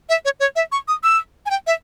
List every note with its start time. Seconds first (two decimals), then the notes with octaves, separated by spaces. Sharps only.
0.09 E5
0.25 C#5
0.40 C#5
0.56 E5
0.72 C#6
0.88 D#6
1.03 E6
1.46 G#5
1.50 G5
1.67 E5